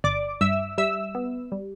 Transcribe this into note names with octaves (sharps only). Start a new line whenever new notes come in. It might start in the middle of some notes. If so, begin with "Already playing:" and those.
G1 D5 D6
G2 E5 E6
G3 E5 E6
B3
G3